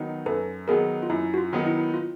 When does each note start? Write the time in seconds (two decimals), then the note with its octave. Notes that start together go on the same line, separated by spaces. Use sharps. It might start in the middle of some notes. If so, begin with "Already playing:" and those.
Already playing: D#3 F#3 B3 D#4
0.26 F#2 A4 B4
0.68 D#3 F#3 B3 D#4 G#4 A#4
1.03 F4
1.10 F#2 E4
1.34 F#4
1.38 F4
1.53 D#3 F#3 B3 D#4
1.66 E4
1.94 F4